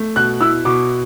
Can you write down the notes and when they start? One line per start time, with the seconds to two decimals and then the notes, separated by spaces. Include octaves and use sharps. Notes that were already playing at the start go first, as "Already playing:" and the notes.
Already playing: A3
0.16 B2 F#6
0.41 E4 E6
0.65 B2 D6